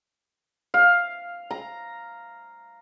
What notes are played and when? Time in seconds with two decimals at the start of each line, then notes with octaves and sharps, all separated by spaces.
0.74 F5
1.51 A#5